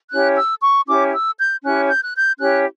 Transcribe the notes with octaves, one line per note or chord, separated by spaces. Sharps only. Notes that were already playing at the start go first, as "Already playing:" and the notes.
C#4 E4 G4 C#5 F#6
E6
C#6
C#4 E4 G4 C#5 D6
E6
G6
C#4 E4 G4 C#5 F#6
G6
F#6
G6
C#4 E4 G4 C#5 F#6